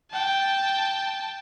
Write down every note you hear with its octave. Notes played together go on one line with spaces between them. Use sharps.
G5 A5